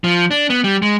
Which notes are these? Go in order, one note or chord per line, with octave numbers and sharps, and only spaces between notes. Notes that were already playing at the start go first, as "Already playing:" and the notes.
F3
D4
B3
G3
G#3